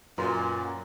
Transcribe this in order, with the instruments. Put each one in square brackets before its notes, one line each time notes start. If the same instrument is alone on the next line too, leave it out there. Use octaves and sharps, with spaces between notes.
[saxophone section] F#2 [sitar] A#2 [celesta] B4 A#5 C6